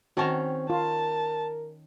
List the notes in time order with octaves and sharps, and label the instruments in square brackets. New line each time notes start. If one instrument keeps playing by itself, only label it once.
[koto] D#3 C#4 A#5 [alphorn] C4 [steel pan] F#4 A5
[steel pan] F4 [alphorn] A#4 [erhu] A5